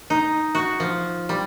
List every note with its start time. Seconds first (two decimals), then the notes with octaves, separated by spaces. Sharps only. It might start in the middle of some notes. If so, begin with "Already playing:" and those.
0.10 D#4
0.55 F#4
0.80 F3
1.29 G3